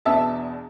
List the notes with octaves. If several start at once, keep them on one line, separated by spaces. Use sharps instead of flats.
E2 B2 B3 D4 E5 A5